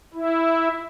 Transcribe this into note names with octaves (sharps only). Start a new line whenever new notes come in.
E4